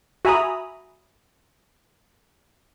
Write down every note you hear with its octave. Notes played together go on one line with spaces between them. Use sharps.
F#4 E5 G#5 A#5 B5 D#6